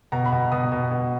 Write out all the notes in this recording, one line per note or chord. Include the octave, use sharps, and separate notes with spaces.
B2 A#5
B5
B2
B2 D#6
B2
B2